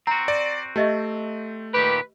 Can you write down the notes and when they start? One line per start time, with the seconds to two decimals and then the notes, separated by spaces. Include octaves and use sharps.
0.07 C4 F#4 A#5
0.28 D5
0.76 A3 G4 D#5 E5
1.74 A#2 D#3 G4 B4